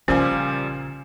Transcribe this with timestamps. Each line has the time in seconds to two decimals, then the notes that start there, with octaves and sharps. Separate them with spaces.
0.08 A#1 A#2 C#3 F3 G3 C#4 C5 G#5